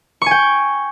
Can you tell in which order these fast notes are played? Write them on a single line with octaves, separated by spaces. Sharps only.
C#6 G#5 G5